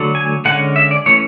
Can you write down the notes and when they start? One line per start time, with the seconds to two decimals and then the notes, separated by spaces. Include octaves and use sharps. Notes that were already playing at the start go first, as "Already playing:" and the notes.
Already playing: D3 F#3 A3
0.15 G#5
0.45 D3 G#3 C#4 F#5
0.76 E5
0.91 D5
1.06 E3 A3 C#4 C#5